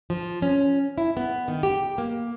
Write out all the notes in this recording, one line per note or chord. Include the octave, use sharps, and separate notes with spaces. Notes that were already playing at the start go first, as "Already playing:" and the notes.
F3
C#4
E4
B3
D#3
G4
A#3